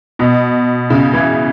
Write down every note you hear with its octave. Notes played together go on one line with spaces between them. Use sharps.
B2
C#3
E3